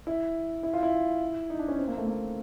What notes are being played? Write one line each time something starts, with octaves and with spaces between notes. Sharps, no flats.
E4
E4
F4
E4
D#4
D4
C#4
C4
A#3
A3
A#3